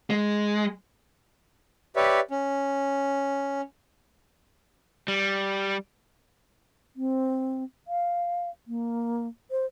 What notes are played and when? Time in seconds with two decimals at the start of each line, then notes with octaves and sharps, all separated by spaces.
0.10 G#3
1.96 G4 B4 C#5 D5 E5
2.31 C#4
5.08 G3
6.96 C4
7.88 F5
8.67 A#3
9.51 C5